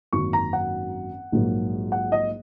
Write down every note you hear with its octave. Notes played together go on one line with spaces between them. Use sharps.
G#1 F#2 D#3 F#3 A#3 C#6
A#5
F#5
A#1 G#2 F#3 A#3
F#5
D#5